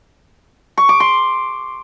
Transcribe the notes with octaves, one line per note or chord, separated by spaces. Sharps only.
C#6
D6
C6